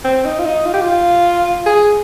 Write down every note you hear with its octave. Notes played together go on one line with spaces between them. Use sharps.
C4
D#4
F4
D#4
F4
G4
F4
G#4